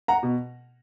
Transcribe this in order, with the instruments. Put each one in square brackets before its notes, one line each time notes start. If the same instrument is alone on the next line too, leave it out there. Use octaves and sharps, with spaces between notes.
[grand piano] F#5 A#5
B2